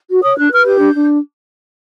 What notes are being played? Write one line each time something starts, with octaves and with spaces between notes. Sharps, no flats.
F#4
C#5 D#6
D4 F#6
B4 F6
G4 G6
D4
D4